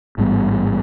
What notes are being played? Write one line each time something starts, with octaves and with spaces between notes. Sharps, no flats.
A1 G#2 G3 B3